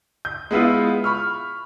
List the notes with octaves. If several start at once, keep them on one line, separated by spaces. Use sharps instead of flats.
G6
G#3 B3 E4 F4
B5 C#6 F6